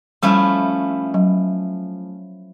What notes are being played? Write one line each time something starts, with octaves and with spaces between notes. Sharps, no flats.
F3 G3 A3 C#4 E4
F#3